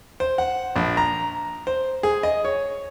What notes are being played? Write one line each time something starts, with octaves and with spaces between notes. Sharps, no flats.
C5
F#5
A#1
A#5
C5
G#4
D#5
C#5